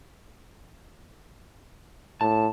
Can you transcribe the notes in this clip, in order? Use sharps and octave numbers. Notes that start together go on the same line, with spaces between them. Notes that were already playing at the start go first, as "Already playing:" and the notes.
A2 A5